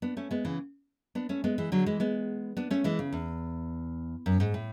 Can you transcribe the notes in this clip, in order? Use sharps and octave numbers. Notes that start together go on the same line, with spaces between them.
B3 D4
A3 C#4
G#3 B3
C#3 E3
B3 D4
A3 C#4
G#3 B3
E3 G#3
D3 F#3
E3 G#3
G#3 B3
B3 D4
A3 C#4
E3 G#3
C#3
E2
F#2
G#2
A2